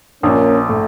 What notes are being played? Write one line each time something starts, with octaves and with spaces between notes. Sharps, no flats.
A#1 A#3 C#4
A2 A3